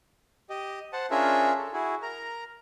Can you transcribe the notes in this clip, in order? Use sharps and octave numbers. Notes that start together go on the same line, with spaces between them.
G4 D#5
C5 F#5 A5
C#4 D4 F4 G#4 A#4 E5
A4
E4 F#4 G#4
A#4 A#5